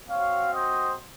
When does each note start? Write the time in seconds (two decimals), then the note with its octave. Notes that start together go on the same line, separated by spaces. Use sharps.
0.09 C4 F#4 C#5 F5
0.53 C5 D#5